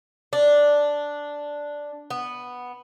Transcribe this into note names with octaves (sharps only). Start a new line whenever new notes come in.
D4
B3